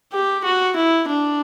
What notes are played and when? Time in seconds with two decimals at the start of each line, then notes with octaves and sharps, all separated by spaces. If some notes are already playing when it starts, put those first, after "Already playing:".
0.12 G4
0.44 F#4
0.76 E4
1.08 D4